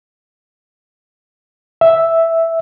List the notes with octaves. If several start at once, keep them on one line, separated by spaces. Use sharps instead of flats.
E5